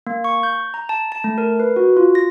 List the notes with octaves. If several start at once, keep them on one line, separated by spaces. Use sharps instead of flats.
A#3
C#6
G6
A#5
A5
A5
A3
A#4
B4
F#4
F4
A#6